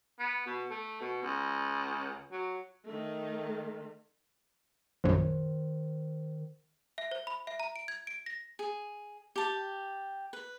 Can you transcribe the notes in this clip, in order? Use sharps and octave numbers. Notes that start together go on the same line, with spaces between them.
B3
B2
A3
B2
C#2
F#3
D#3 A3
A#1 F#2 D#3 C5
E5
C5
B5
E5
A#5
D7
G#6
D7
A#6
G#4
G4 A5
B4